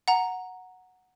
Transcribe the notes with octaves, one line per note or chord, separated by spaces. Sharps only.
F#5 A#5